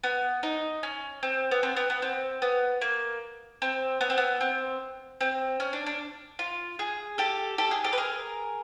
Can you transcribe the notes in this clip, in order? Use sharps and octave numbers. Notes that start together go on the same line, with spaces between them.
B3
D#4
C#4
C4
B3
C4
B3
B3
C4
B3
A#3
C4
B3
C4
B3
C4
C4
C#4
D4
D4
F4
G#4
G4 A4
G4 A4
G#4
G4 A4
B4
G#4 A#4